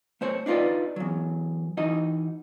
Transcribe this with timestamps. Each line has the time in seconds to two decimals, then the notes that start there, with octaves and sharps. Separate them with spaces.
0.21 A3 C5 C#5
0.46 D4 D#4 F4 B4 D5
0.96 E2 F#3
1.77 E3 D#4 F#4 D#5